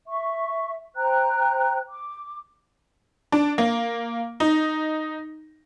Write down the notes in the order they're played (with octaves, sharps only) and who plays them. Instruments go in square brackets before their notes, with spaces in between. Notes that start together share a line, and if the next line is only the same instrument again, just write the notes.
[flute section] E5 C#6
C5 G5 A#5 F#6
D6
[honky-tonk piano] D4
A#3
D#4